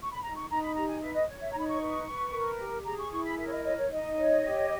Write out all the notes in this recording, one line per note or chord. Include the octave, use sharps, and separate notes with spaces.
C#6
B5
D#4 A#5
C#6
D#4 A#5
B5
G4 A#5
G#5
B4 E5
D#5
C#5
E5
D#4 A#5
B5
C#6
B4
B4
A#4
G4
G#4 A#5
C#6
E4 C#6
B5
A#4 E5
C#5
D#5
C#5 D#5
C#5
D#4 D#5
C#5
G4